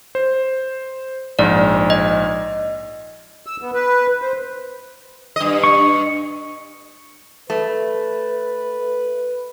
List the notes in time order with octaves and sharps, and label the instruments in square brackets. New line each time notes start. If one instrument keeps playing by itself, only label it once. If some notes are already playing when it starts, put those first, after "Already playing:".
[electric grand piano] C5
[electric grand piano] A#1 G#2 [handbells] D5
[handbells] D#5
[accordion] E6
B3
B4
C5
[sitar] G2 D#5
[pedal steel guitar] C#6
[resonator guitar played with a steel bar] A3 [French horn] B4